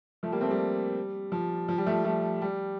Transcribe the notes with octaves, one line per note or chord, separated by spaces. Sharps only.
F3 A3
G3 A#3
A3 C4
G3
F3
F3
G3
F3 A3
F3 A3
G3